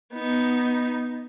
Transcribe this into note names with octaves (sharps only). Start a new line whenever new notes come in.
B3 D#4